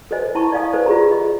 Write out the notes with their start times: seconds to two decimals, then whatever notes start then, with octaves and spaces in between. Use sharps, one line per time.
0.11 A4 B4 C5 D#5 G#5
0.35 E4 A5 A#5 C#6
0.52 D5 D#5 F5 G#5 D#6
0.73 A4 B4 C5 D5
0.86 F4 G4 G#4 A#5
1.11 D#5